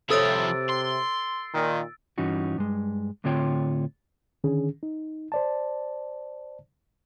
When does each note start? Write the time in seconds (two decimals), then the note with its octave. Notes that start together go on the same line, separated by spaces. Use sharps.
0.10 C3 F3 E4 A4 C#5 E6 A6 D7
0.70 C6
1.55 A#2 D#3
2.18 G2 E3 C#4 D#4 F#4
2.58 G2 G#3
3.24 A2 D3 C4 F4 C#5 G5
4.44 D3 D#3 C#4 D4 G#4
4.83 D#4
5.32 C5 D5 A5